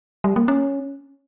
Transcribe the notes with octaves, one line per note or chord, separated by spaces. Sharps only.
G3
A#3
C#4